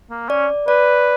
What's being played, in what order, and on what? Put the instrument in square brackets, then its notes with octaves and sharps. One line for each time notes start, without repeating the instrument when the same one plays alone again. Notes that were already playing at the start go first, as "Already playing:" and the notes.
[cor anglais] A#3
[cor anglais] C#4 [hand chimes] D5
[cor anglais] B4 [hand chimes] D5